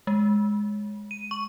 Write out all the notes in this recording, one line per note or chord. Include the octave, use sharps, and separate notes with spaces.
G#3
D#7
C#6